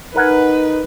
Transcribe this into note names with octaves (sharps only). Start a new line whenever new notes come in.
D#4 A#4 B4 F#5 G#5